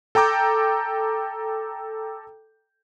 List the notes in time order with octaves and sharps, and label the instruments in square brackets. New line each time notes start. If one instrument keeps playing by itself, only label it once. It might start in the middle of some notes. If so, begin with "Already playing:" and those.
[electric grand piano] A4 G5 A#5 D6 G6